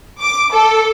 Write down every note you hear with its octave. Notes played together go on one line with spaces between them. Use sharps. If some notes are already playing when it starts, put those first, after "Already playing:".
D6
A4